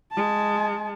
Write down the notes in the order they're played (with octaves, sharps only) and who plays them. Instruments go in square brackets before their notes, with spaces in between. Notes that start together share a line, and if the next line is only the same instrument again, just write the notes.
[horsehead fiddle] G#3 A5